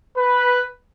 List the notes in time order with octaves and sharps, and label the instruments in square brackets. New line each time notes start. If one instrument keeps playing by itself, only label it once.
[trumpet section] B4